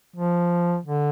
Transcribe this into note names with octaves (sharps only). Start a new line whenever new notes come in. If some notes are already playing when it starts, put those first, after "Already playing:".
F3
D3